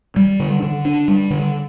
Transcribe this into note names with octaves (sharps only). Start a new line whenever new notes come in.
G3
D3
D3
D4
G3
D3